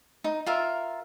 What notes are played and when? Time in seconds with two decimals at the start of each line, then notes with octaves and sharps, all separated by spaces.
0.24 D#4
0.46 F4 A#4 E5